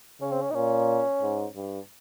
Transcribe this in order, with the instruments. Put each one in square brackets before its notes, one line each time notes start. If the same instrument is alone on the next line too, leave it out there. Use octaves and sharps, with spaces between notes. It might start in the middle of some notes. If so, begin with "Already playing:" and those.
[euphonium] C#3 [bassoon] C#4
[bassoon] C4
C#4
D#4
[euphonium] A#2 [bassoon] C#4
[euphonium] G#2
G2